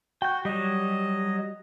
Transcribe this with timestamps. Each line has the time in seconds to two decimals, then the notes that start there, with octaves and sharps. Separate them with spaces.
0.22 F#4 G5 G6
0.45 F#3 G3 D#5